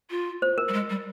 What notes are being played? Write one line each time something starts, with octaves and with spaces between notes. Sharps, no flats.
F4
C5
A#4
G3
G#3
G3